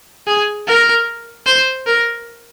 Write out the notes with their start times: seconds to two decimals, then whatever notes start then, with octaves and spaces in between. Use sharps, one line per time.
0.27 G#4
0.67 A#4
1.46 C5
1.87 A#4